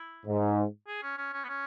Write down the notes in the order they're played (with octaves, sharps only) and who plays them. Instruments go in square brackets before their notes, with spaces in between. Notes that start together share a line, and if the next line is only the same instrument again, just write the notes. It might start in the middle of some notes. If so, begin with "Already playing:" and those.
Already playing: [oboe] E4
[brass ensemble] G#2
[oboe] G#4
C#4
C#4
C#4
B3
C#4